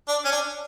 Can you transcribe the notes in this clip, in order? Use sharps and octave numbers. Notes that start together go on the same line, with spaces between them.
D4
C#4
D4